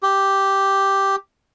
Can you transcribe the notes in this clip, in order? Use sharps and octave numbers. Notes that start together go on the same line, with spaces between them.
G4